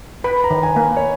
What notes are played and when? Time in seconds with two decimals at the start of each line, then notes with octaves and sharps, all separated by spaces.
0.24 B4 B5
0.44 A#5
0.51 D#3
0.63 G#5
0.76 A#3
0.97 C#5